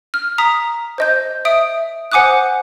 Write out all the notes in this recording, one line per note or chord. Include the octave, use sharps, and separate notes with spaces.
F6
A#5 D#6 B6
C5 D#5 G6
E5 D#6 D7
C5 F#5 G#5 D6 D#6 F#6